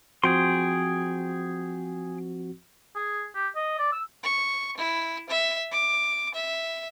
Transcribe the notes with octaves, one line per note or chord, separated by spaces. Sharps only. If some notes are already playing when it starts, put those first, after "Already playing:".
F3 C4 F#4 G#4 G5 C6
G#4
G4
D#5
D5
E6
C#6
E4
E5
D6
E5